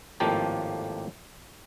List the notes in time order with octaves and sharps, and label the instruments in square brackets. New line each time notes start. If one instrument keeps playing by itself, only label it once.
[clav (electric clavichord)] G#1 A2 F3 A#3 G4 A5